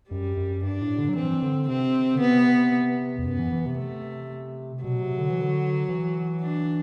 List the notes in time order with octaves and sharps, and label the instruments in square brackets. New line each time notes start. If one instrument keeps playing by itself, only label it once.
[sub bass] F#2 [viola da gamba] G3
[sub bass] F#2
[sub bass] G2 [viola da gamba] D4
[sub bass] A2
D3
F#3
[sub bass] E3 [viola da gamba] C4
[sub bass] D3
[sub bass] C3 [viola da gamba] C4
[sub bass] D3
[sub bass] C3 [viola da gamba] B3
[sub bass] E2
[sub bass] F#2 [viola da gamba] B3
[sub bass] E3
E3
C3
[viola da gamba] A3
[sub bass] B2 [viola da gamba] F#3
[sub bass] C3
D3
E3
D3
E3
[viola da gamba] D4